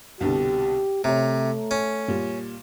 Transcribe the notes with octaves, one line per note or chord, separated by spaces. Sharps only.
C2 B2 D3 G4
C3 A3 C#5 A#5
C#4
A#2 G3